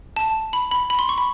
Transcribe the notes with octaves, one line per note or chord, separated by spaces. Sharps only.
A5
B5
B5
B5
C6
C#6
B5